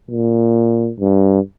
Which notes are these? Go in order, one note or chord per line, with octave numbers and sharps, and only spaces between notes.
A#2
G2